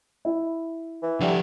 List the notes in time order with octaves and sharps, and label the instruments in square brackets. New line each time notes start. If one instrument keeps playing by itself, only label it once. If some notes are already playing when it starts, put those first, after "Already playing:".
[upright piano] E4
[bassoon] E3
[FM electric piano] D3 G3 A3 [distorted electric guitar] F3 F#5